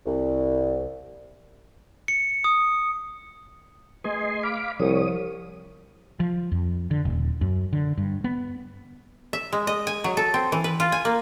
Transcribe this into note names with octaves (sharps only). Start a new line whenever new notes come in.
C2
C#7
D#6
A3 G#4 B4 D#5 G#5 C6
F5 B5 D6
C2 F3 G3 C#5 D#6
F3
F2
D3
D#1
F#2
D3
G2
B3
E5
G#3
D#5
G#5
F#3
A4
C4
E3
B4
F4
G#5
A#3